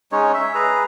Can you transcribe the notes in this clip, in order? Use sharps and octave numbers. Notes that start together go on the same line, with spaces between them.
G#3 C#4 D#4 C#5
E5
G#4 B4 A#5